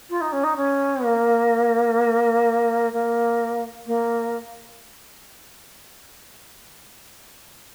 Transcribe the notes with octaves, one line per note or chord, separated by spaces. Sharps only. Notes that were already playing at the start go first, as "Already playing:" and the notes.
F4
D#4
C#4
D#4
C#4
A#3
A#3
A#3